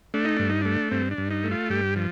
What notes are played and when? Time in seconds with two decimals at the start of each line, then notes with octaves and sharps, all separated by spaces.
0.14 A3 D4
0.25 D#4
0.37 G2 D4
0.49 D#4
0.62 A3 D4
0.91 G2 C4
1.11 D4
1.18 G2
1.31 D#4
1.44 A3
1.51 F4
1.70 G2 G4
1.96 F3